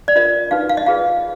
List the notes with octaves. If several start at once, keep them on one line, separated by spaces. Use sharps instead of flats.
D5
F4 A#4 D#5
D#4 F#4 B4 F5
F5
D#5
F4 G#4 B4 F5